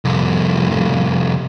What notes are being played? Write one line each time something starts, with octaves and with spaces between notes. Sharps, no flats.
C2 F2